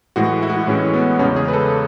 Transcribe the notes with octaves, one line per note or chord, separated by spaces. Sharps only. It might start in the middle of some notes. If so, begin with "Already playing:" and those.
A2 E3 G#3 F#4
E4
F#4
E4
A2 E3 G#3 C#4
B3
E2 C#3 G#3 C#4
G#4
B4
A4